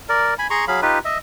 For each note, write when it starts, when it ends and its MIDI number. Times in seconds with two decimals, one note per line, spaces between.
0.09 0.34 70
0.09 0.34 74
0.39 0.47 80
0.39 0.47 83
0.50 0.65 68
0.50 0.65 82
0.50 0.65 84
0.50 0.65 85
0.68 0.81 54
0.68 0.81 68
0.68 0.81 77
0.68 0.81 83
0.82 0.99 63
0.82 0.99 65
0.82 0.99 67
0.82 0.99 71
1.05 1.18 75
1.05 1.18 76